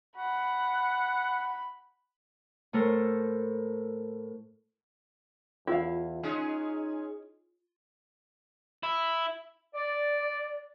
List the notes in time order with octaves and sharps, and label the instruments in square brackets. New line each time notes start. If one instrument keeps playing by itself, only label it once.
[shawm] F#5 [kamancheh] B5
[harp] A2 A3 A4 A#4 C5
[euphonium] E2 [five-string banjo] E4 F5 [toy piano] F4
[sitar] G#3 C#4 G#4 [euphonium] D#4
[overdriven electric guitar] E4
[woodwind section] D5